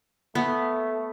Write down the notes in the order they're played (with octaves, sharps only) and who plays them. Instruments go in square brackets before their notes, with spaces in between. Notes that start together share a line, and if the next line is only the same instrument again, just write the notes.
[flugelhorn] A3 [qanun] B3